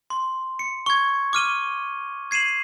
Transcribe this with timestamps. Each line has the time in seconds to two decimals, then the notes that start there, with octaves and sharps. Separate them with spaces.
0.10 C6
0.59 C#7
0.86 C#6 G#6
1.33 D6 F6 D#7 G7
2.31 G#6 C7 D#7 E7 F#7